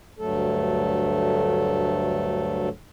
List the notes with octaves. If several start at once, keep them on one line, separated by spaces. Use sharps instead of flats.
D2 G2 F#3 A3 A4